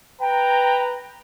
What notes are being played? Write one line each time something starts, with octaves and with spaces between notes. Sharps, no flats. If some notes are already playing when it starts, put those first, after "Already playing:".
B4 G5 A#5